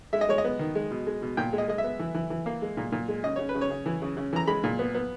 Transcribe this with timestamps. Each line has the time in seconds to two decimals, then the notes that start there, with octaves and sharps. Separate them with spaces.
0.13 G#3 E5
0.21 D#5
0.29 G#3 C#5
0.38 D#5
0.44 B3
0.59 D#3
0.75 G#3
0.91 B2
1.07 G#3
1.22 B2
1.37 A#2 G5
1.53 G#3
1.58 D#5
1.68 G#3 D#5
1.78 E5
1.84 B3
1.99 E3
2.14 E3
2.30 E3
2.46 A#3
2.62 G#3
2.77 A#2
2.92 A#2
3.08 G#3
3.23 C#3 D#5
3.36 C#3 C#5
3.49 B4
3.55 C#3
3.61 C#5
3.70 C#3
3.86 E3
4.02 C#3
4.17 C#3
4.33 E3 A#5
4.47 G#3 B5
4.64 A#2
4.79 B3
4.94 B3